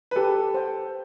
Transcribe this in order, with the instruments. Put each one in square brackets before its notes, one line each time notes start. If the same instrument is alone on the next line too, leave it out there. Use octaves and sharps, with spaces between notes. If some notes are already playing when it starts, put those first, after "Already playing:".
[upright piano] B4
[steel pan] G4 [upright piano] A4
[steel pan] C5 G5